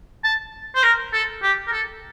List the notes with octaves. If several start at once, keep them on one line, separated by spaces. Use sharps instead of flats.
A5
C5
A#4
A4
G4
A#4
A4